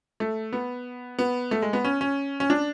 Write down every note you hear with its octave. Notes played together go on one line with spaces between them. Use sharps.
A3
B3
B3
A3
G#3
B3
C#4
C#4
C#4
D4